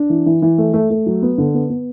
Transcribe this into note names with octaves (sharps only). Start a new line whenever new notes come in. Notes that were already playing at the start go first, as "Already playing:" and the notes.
Already playing: D4
E3
E3
E3
A3
A3
A3
F#3
B3
D3
B3
B3